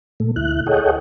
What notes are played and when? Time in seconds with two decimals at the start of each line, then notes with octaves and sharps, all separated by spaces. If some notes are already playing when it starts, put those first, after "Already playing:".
0.20 A#2 A3
0.36 D2 E4 F#6
0.67 G#4 A4 C#5 D#5 F#5 G5